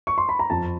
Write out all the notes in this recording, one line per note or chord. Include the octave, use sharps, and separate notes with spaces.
C#6
C6
B5
A#5
F2 A5